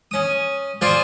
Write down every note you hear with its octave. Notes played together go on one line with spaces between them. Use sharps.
C#4 D#6
F4 G#4 C5 D5